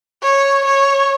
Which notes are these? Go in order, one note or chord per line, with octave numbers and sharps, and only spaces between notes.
C#5
C#5